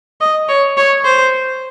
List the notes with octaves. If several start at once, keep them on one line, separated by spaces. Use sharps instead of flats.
D#5
C#5
C#5
C5